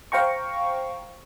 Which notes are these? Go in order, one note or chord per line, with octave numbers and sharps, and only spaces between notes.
C5 F5 G5 A#5 C#6